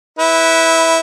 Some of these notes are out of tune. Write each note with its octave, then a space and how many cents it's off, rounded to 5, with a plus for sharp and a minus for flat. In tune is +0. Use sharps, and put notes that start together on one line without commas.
E4 -15 B4 +0